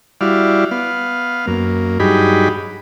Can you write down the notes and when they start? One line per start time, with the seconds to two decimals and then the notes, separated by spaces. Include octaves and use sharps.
0.21 G3 E4 F#4 D5 F5
0.71 B3 F5
1.47 F#2 A#3
2.00 G2 F#3 D#4 G4 G#4 B5